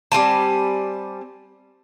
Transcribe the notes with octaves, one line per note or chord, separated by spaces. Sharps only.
G3 C4 G#5 A5